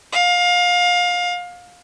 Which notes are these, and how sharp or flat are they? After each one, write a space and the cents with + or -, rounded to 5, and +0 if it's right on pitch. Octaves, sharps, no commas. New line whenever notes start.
F5 +25